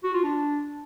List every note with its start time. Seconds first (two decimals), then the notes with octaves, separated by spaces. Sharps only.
0.03 F#4
0.14 F4
0.24 D4